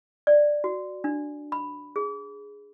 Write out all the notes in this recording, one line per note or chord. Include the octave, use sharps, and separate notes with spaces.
D5
F#4
D4
B5
G#4